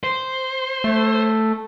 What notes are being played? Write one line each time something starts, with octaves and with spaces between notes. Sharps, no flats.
C5
A3